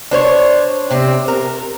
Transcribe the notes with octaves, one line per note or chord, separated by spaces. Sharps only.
D4 C5 C#5
C3 C4
A#4